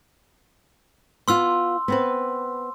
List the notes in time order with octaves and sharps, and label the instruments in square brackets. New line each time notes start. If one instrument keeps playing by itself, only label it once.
[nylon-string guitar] B3 F4 [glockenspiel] C6 E6
[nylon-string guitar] B3 C4 B4